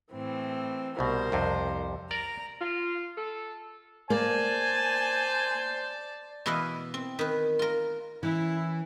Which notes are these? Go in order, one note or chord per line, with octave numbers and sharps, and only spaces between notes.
A2 E3 C4
C2 B2 A#4 C5
C2 F2 C3
A#4 D5 A#5
F4
A4
A#3 C5 D5 G#5 A5
B2 E3 E4 B4 D#5 F5
C4
D#3 B4
F4 A#4
E3 C#4 E4